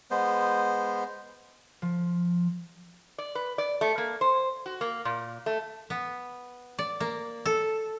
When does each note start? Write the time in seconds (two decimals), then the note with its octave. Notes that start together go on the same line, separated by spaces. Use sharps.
0.11 G#3 B3 C5
1.82 F3
3.18 D5
3.35 B4
3.58 D5
3.81 A3
3.98 A#3
4.21 C5
4.66 F#4
4.81 A#3
5.05 A#2
5.46 A3
5.90 B3
6.79 D5
7.00 A#3
7.46 A4